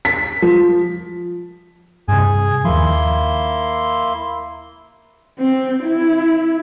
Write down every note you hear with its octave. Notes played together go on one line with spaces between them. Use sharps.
B6
F3
G2 C3 G#4 G#5
D#2 F3 A#3 E4 C6
C4
E4